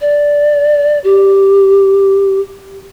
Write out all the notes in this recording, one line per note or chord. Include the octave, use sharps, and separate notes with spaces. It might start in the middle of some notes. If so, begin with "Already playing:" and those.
D5
G4